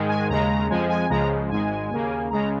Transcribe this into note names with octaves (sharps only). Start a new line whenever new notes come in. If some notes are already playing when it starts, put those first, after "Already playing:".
Already playing: G#2 D#3 G#3
G#5
D#2 C#3 G#3 A#5
F2 F3 G#3 G#5
G#5
C#2 C#3 F3 G#3 A#5
G#1 G#2 G#3 G#5
D#2 C#3 A#3
C#2 C#3 G#3 A#5